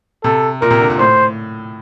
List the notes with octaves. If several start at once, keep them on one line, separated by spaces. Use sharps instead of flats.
C3 A4
A#2 A#4
C3
D3
A#2
A2 C5